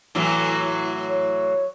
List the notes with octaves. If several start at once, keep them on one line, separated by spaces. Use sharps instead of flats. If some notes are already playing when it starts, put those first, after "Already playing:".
A2 E3 F#3
C#5